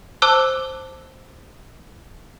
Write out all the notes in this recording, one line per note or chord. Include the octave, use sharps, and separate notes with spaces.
C5 A5 D6 E6 F#6